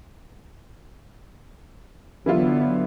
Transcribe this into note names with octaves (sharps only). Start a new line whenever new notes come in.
D3 E3 F#3 B3 E4 F4